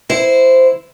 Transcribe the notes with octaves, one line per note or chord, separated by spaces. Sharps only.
E4 C5